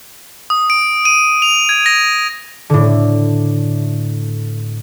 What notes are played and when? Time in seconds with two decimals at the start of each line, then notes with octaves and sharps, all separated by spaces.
0.50 D#6
0.70 D7
1.05 D#7
1.42 F7
1.69 G#6
1.86 A#6
2.70 A2 D3